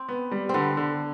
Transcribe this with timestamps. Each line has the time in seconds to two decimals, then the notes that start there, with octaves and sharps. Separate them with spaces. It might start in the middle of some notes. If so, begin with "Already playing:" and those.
Already playing: C4
0.09 B3
0.32 G3
0.49 D3 B3 C4
0.77 D3